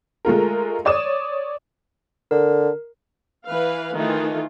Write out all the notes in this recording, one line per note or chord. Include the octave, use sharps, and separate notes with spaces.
G#3 A3 F4 A#4
C#5 D5 D#6 E7
D3 A#4
E3 B4 F5
D#3 E3 A3 D#4 F4 A4